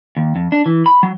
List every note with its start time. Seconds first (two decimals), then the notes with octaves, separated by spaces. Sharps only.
0.17 D#2
0.36 F2
0.52 D4
0.66 E3
0.86 B5
1.03 F#3